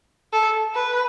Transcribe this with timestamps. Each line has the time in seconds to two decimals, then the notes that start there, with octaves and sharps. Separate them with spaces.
0.33 A4
0.75 B4